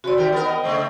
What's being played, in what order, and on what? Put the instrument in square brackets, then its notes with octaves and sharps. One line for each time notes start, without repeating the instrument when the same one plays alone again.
[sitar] C3 C4 [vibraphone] F#4 D5
[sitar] D#3 G4 A#4 [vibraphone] G5
[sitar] B3 A#4
[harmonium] D#5
[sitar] C#3 A3 C4